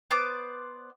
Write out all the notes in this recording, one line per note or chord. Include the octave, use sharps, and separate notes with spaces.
B3 C5 D5 D6